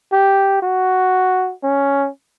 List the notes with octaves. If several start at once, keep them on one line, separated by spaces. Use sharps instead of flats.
G4
F#4
C#4